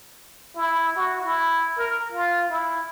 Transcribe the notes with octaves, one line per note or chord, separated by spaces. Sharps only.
E4
F#4
E4
A#4
F4
E4